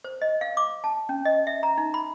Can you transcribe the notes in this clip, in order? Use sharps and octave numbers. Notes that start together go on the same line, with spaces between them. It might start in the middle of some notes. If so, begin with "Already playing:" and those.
C5
D#5
F5
D6
A5
C#4
D#5
E5
A#5
D#4
B5